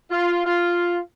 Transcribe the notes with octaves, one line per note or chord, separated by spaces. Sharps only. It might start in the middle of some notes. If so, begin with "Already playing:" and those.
F4
F4